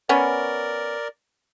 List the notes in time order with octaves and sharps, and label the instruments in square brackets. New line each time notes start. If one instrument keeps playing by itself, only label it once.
[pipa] B3 C#4 [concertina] A#4 D5